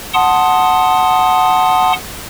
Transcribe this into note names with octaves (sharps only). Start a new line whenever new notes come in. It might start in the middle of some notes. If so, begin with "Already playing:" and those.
F#5 A5 C6 D#6